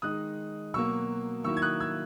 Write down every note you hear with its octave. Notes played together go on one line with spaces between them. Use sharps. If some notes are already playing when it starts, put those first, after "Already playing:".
D#3 G#3 D#4 D#6 F#6
B2 F#3 A#3 C#6 E6
D#3 F#3 A#3 E4 C#6 E6
G#6
D#6 F#6
E6 G#6